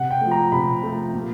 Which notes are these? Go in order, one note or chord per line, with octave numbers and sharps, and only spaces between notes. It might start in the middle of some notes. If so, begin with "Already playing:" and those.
Already playing: C3 F#5
G5
F3 A3
A#5
C3 B5
F3 A3
A#2